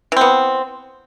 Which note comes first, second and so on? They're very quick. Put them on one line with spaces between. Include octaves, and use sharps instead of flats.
E3 C4 B3